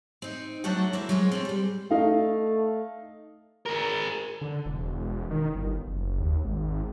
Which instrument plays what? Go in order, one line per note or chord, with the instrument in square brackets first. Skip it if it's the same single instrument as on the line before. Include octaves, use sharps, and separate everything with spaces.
[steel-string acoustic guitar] C4 D#4
F#3 A3 D4 F#4 A4 F#5
G#3 A#3 C4 E4
F#3 G#3 F4
C4 C#4 A4
G3 G#3
[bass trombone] A3 [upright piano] D#4 F5
[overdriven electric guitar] G#4 A#4
[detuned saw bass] D3
E1
D#3
G1
F#1
D#2
G#1